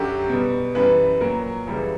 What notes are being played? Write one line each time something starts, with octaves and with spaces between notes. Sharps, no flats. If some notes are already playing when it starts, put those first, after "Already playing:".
Already playing: F#2 D3 F#3 G4
B2 G3
F#2 E3 G3 B4
A#2 F#3 A#4
F#2 C#3 E3 G3